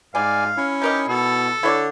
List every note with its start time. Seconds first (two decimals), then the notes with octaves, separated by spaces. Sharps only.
0.15 G#2 G3 D5 F5 G#5
0.57 C#4 E4
0.82 D#4 G4 A#4 D#5
1.08 B2 A4
1.63 D3 E4 C#5 D5